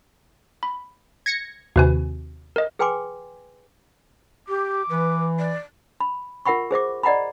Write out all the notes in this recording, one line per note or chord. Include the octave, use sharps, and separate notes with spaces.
B5
G#6 A#6 C#7
D#2 C3 F#4 B4 G#5
A#4 D#5
G#4 B4 G5 G#5 C6 D6
G4 D6
E3 B4
D5
B5
F4 A#4 E5 F#5 B5 C#6
G#4 C5 E5 D6
D5 D#5 F#5 A#5 B5